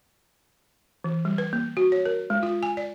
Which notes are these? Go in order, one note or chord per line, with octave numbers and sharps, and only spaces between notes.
E3
G3
B4
A#3
F#4
C#5
A#4
G#3
F4
G#5
D5